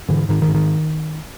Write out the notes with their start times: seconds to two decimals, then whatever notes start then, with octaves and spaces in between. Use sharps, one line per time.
0.09 G#2 D3 E3
0.29 G#2 D#3
0.42 D#3
0.48 G#2
0.55 D#3